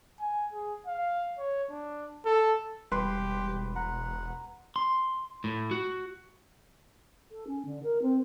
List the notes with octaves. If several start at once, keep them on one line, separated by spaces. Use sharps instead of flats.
G#5
G#4
F5
C#5
D4
A4
E1 G3 G4 B4 C6
F#5 A#5
C6
A2
F#4
A4
C#4
D3
A#4
C4